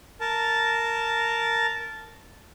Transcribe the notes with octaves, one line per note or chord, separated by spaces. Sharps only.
A#4 A5